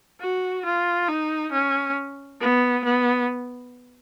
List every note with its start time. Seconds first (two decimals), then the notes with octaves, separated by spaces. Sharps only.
0.20 F#4
0.65 F4
1.08 D#4
1.52 C#4
2.41 B3
2.84 B3